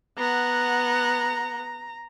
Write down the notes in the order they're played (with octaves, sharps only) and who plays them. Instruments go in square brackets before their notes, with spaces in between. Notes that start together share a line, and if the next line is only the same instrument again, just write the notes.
[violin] B3 F#5 [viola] A#5